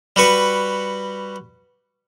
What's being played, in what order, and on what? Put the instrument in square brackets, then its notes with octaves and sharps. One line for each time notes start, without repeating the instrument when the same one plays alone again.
[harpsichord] G3 F#4 B4 C#6